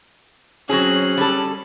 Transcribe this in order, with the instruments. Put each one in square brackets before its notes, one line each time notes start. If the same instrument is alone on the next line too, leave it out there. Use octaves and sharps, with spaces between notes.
[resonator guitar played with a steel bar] F#3 C4 G#4 [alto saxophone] C#4 [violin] F#6
[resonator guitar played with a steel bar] G3 A4